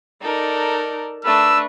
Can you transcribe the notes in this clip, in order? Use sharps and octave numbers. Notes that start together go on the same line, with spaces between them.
D#4 A4 A#4 D5
A3 D4 B4 E6